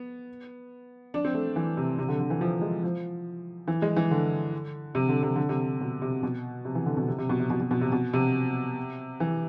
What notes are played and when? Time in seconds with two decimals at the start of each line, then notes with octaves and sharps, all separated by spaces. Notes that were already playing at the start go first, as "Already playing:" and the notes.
Already playing: B3
1.14 D4
1.25 C4
1.34 A3
1.56 E3
1.77 C3
1.98 C3
2.08 D3
2.20 D3
2.30 E3
2.41 F3
2.61 G#3
2.83 F3
3.68 E3
3.82 G#3
3.96 E3
4.11 D3
4.95 C3
5.09 D3
5.23 C3
5.36 D3
5.49 C3
5.81 B2
6.02 C3
6.23 B2
6.65 C3
6.75 E3
6.86 D3
6.97 B2
7.08 C3
7.18 C3
7.29 B2
7.40 C3
7.50 B2
7.60 B2
7.71 B2
7.81 C3
7.92 B2
8.13 C3
9.20 E3